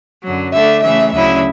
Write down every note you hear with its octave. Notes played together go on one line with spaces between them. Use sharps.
F#2 D3 F#3
D3 A3 D4 E5
C#3 E3 A3 E5
D2 C#3 F#3 C#4 E4 E5